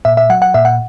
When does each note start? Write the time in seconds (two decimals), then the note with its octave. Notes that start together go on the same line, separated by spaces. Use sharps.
0.05 A#2 E5
0.17 E5
0.30 F#3 F#5
0.42 F#5
0.54 A#2 E5
0.65 F#5